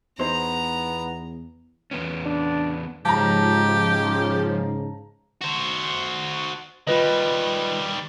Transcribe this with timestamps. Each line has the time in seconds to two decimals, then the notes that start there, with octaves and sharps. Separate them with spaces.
0.19 E2 B3 D#4 E4 C5 A#5
1.91 E2 B3 C#4
2.26 D4
3.05 G#2 C#3 F3 G4 A5 A#5
5.41 F#4 C5
6.87 D#3 G3 F4 B4 D#5